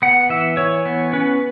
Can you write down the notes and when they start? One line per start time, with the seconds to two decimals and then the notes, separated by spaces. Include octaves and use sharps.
0.02 B3 F#5
0.29 E3 E5
0.57 E3 C#5
0.86 B3
1.13 C#4 B4